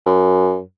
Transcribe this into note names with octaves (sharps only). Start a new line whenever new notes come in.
F#2